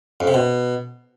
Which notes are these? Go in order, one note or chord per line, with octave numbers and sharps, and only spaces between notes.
F2
C3
B2